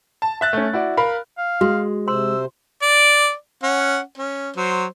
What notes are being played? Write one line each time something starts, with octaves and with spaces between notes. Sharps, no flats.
A5
E5 F#6 A6
A3 C#4
E4 F#4 D5
A#4 F5 B5
F5
G#3 F#4
C3 C5 C6 E6
D5
C#4 F#5
C#4
F#3 C5